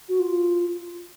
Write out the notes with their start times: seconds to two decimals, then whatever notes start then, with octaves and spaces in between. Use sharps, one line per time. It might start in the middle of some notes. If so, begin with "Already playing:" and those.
0.08 F#4
0.19 F4